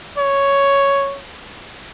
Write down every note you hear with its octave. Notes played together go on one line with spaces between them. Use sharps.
C#5